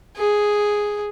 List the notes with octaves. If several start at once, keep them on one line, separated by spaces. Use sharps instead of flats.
G#4